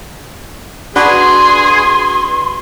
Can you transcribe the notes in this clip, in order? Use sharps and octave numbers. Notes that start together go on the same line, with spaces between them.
D4 F#4 G#4 B4 C6